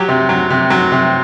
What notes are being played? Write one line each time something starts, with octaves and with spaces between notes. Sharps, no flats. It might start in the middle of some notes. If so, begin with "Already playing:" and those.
Already playing: F#3 G4
C3
F#3
C3
F#3
C3